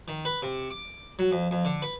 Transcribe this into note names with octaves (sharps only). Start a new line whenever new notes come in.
D#3
B4
C3
D6
F#3
F2
F2
D3
B4